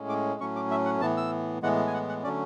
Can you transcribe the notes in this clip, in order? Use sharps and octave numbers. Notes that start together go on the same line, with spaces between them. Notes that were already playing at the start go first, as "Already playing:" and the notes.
Already playing: A2 G#3 C#4
D6
A2 F#3 A3 C#4 C#6
D6
E5
F#5
A2 E3 B3 A5
E6
A2 E3 G#3 B3 F#5
G#5
F#5
F#5
D3 F#3 A3 C#4 D5